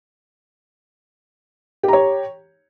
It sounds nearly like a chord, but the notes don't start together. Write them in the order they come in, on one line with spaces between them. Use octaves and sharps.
G4 A#5 C#5